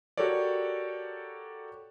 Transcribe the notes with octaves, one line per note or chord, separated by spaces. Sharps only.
F#4 G4 A4 A#4 C#5 D5